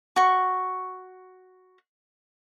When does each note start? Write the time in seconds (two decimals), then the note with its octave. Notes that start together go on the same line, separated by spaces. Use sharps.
0.16 F#4 C#6